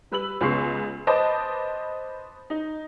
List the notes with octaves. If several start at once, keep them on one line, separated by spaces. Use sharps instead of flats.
G3 B4 E6 F#7
C#2 C#3 B3 C6 C#6 C7
B4 C5 D#5 A5 D6
D#4